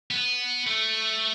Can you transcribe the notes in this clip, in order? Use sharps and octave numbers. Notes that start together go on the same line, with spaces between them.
B3
A3